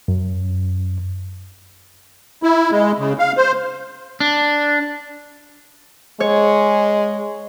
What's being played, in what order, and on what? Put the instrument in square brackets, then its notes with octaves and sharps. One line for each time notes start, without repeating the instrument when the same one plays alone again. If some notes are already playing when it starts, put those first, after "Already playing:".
[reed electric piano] F#2
[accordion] E4
G#3
C#3
F5
C5
[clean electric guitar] D4
[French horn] G#3 [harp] C#5